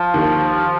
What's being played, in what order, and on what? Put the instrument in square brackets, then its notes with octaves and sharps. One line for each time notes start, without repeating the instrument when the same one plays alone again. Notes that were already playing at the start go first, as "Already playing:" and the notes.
Already playing: [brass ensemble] F3
[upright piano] D#2 D#3